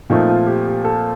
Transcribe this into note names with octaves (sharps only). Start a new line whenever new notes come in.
A#2 F3 A3 C4 D#4
F4
G4
G4
A4